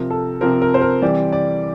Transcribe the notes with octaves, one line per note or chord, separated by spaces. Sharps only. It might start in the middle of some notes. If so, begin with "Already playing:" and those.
Already playing: C3 F3 C4 A#4
A4
C3 F3 C4 A#4
A#4
C5
A#4
C3 E3 G3 C4 D5
D5